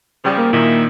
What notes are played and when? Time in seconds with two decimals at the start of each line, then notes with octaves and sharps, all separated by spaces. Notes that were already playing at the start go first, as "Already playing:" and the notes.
0.25 C#3 F3 G3
0.38 A#3
0.53 A#2 D#3 D#4 E4